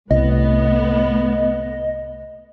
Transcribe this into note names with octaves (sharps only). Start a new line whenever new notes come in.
C2 A2 B3 D#5